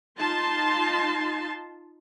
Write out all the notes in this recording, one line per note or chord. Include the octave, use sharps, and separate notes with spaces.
D#4 F4 A5 C6